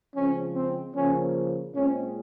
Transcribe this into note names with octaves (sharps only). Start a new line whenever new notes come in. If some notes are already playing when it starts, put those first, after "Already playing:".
C#3 F3 G#3 C4 C#4
C4
C#3 F3 A#3 C#4
A#2 G#3 C4 C#4